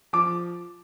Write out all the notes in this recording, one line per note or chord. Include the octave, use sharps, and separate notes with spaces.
F3 D6